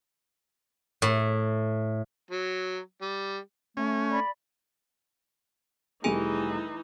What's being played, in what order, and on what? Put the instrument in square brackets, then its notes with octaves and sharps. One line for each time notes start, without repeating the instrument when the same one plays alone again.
[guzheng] A2
[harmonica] F#3
G3
[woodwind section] A3 [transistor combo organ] C#4
[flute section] D5 B5
[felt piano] F1 G3 D#7 [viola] E3 D#4 [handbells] G#4 G#5